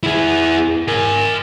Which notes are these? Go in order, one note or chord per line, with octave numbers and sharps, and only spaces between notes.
E4 G#4
A#4 G#5